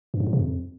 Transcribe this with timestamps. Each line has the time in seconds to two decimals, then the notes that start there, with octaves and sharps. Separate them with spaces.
0.14 G2
0.20 G#2
0.27 A2
0.33 C3
0.39 F2